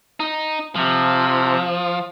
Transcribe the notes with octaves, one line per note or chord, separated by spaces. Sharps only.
D#4
C3 F3